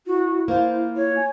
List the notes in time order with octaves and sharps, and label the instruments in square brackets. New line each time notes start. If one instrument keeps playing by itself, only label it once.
[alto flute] E4 [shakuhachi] F#4
[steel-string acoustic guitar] A#3 F4 [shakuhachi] C5
[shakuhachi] C#5
[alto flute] G#5